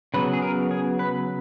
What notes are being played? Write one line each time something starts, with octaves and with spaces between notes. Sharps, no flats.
C#3 F#3 B3 B4
G#4
A#4
G#4
B4